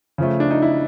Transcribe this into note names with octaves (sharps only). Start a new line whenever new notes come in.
C#3 F3 A3
D4
D#4
E4